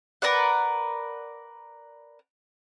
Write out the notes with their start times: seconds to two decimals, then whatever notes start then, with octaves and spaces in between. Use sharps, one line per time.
0.22 A#4 B4 D5 F#5